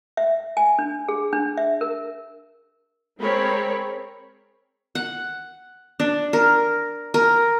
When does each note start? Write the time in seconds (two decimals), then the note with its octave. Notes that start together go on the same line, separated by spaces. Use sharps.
0.17 E5
0.57 G#5
0.79 D4
1.09 G#4
1.33 D4
1.57 E5
1.81 A#4
3.19 G#3 C4 G#4 A#4 C#5 B5
4.95 F#5
6.00 D4
6.33 A#4
7.14 A#4